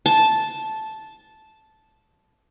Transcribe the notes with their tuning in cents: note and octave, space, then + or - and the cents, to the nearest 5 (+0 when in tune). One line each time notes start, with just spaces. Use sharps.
A5 -10